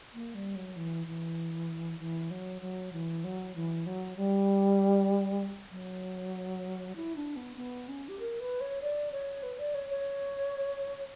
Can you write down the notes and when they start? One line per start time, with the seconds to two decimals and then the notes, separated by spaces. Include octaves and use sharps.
0.14 A#3
0.35 G3
0.56 F#3
0.76 E3
1.07 E3
2.00 E3
2.31 F#3
2.62 F#3
2.92 E3
3.24 F#3
3.55 E3
3.86 F#3
4.16 G3
5.72 F#3
6.96 E4
7.16 D4
7.36 B3
7.57 B3
7.88 C#4
8.08 G4
8.20 A#4
8.40 B4
8.61 C#5
8.82 D5
9.12 C#5
9.43 B4
9.59 D5
9.74 C#5
9.90 C#5